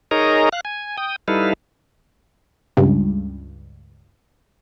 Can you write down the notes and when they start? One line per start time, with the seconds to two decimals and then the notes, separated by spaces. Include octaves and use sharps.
0.11 D#4 G#4 A#4 C#5 D#5 A#5
0.53 F5 F#6
0.65 G#5
0.98 G5 D#6
1.28 G3 D#4 E4 A4 B4 F5
2.77 C#2 G2